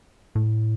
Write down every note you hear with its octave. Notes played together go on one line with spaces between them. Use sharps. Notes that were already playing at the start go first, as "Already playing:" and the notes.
A2